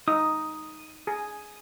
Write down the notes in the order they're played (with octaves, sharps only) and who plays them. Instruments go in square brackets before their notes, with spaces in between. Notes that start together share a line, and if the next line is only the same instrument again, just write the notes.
[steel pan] D#4 [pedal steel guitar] D#6
[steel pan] G#4